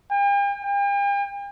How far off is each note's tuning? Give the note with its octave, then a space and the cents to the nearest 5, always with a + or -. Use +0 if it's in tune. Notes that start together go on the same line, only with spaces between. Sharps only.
G5 +45
G5 +45